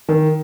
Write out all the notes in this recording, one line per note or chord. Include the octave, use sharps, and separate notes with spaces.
D#3